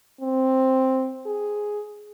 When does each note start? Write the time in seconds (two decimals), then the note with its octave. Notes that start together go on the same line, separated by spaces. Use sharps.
0.21 C4
1.26 G#4